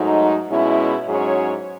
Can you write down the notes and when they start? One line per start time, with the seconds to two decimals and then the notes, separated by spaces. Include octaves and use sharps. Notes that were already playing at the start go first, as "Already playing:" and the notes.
Already playing: G#2 F#3 A3 D#4
0.50 B2 G#3 C#4 E4
1.07 G#2 F#3 C#4 G#4 C#5